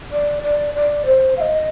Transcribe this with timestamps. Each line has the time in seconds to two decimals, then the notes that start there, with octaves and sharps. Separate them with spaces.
0.12 D5
0.43 D5
0.75 D5
1.06 C5
1.37 F5
1.41 D#5